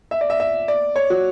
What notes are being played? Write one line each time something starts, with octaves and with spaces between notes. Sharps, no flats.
E5
D5
E5
E5
D5
C#5
F#4